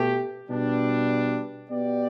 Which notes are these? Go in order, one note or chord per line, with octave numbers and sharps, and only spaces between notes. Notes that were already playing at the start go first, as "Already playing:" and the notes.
Already playing: B2 A3 G4
B2 G3 D4
B2 B3 G4 D5